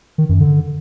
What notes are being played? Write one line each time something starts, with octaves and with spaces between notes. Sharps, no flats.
D#3
F#2
D3